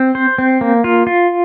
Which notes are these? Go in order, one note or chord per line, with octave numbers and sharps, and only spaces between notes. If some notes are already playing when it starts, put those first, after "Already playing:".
Already playing: C4
C5
C4
A#3
F4
F4